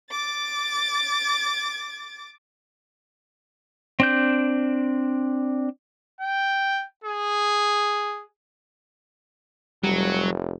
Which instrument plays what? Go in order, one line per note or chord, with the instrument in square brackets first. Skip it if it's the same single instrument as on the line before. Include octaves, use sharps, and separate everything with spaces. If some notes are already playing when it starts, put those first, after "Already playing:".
[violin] D6 A6
[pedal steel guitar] C4 D4 G6
[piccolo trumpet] G5
G#4
[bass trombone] F1 [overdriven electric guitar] F#3 [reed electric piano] G3